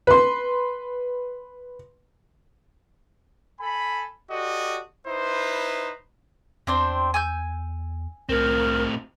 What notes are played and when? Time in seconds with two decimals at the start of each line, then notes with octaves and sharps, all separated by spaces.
0.07 B4 C6
3.61 A4 G#5 B5
4.31 F#4 G4 A4 D5 D#5
5.07 D#4 E4 B4 C5
6.67 E2 C4 D4 C5
7.14 G#5 E6 G6
8.29 C2 A2 C4 A#4